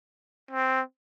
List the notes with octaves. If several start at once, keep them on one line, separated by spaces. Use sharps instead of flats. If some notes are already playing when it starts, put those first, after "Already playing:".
C4